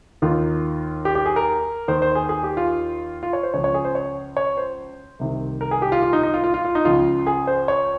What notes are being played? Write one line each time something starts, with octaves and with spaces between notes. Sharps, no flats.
D#2 D#3 F4
G4
G4
G#4
A#4
D#2 D#3 C5
C5
G#4
G#4
G4
F4
F4
C#5
C5
C#2 C#3 F3 C#5
C#5
G#4
C5
C#5
C#5
C5
C2 C3 D#3
A#4
G#4
G4
F4
F4
D#4
D#4
F4
F4
F4
F4
D#4
C#2 C#3 F3 F4
G#4
C5
C#5